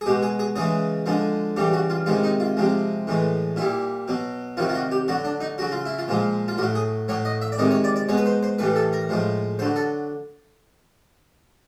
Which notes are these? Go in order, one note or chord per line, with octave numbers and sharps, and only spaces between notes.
G#4
B2 G#3 G4
G#4
G#4
C#3 E3 G#3 G#4
D3 F3 G#3
C#3 E3 G3 G4
F#4
F4
C3 D#3 G#3 F4
D#4
F4
C3 F3 G#3
A2 E3 G#3
A#2 G3 E4
B2 F#3
C3 D#3 F#3 F4
F4
F#4
G4
D3 F#3 F#4
D4
D#4
C#3 F#3 F#4
F4
E4
F4
A#2 F3 G#3
F4
A2 F#3 F#4
G#4
A2 F#3 C#5
D#5
E5
D5
C3 D#3 G#3 D#5
C#5
D5
D5
B2 G#3 C#5
B4
C5
C5
A2 E3 G3 B4
A4
A#4
A2 F3 G#3
D3 F#3 C5
A4